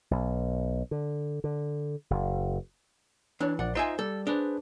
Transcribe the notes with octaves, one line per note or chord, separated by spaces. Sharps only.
B1
D3
D3
F#1
E3 D4 C#5
A#1 D5 F#5
D#4 F4 C5 D#5 E5 G#5
G3 A4
D4 G#4 B4 C5